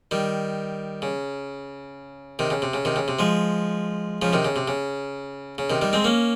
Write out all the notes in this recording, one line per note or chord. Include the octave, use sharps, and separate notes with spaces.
D#3 G3
C#3
C3 D#3
C#3
C3
C#3
C3 D#3
C#3
C3
F3 G#3
C#3 F3
C3 D#3
C#3
C3
C#3
C#3
C3 D#3
D#3 G3
G#3 C4
A#3 C#4